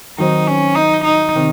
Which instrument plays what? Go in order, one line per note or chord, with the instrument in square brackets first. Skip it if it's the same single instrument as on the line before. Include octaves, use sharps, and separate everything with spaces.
[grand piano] D#3 F#3 C4 [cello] D#4
[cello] C#4
D#4
D#4
[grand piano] C3 D#3